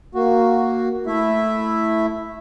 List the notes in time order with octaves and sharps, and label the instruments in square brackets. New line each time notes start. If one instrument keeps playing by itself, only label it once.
[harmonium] A#3 F#4
A3 E4 E5